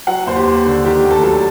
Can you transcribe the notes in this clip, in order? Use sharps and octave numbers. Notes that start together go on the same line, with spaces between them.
F#3 F#5
D#2 C5
G4
D#2
D3
D#3 G4
D2
A4
F#3 A4